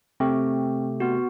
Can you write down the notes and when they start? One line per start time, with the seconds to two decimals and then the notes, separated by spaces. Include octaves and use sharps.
0.20 C3 A3 C4 G4
1.00 B3 F#4